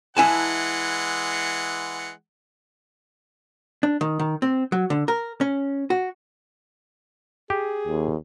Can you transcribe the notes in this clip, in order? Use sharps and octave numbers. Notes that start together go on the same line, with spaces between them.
E3 G#3 E4 F#5 G#5 A5
D4
D#3
D#3
C4
F#3
D3
A#4
C#4
F#4
G4 G#4
D#2